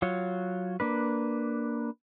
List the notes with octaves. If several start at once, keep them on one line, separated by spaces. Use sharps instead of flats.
F#3 F4 C#5
A#3 D4 B4